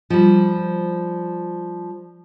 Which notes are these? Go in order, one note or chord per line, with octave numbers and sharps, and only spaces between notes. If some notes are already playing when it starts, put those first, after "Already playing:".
F3 G3